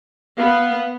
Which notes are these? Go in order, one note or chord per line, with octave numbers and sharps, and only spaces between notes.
B3 F5